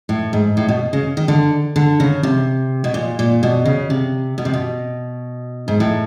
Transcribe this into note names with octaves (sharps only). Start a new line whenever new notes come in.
A2
G#2
A2
B2
C#3
D#3
D3
D3
C#3
C3
B2
A#2
A#2
B2
C#3
C3
B2
C3
B2
G#2
A2